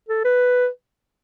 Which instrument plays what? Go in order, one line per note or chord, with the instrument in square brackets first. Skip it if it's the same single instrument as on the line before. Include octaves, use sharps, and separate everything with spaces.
[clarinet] A4
B4